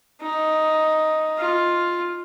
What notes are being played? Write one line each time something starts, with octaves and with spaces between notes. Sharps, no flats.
D#4
F4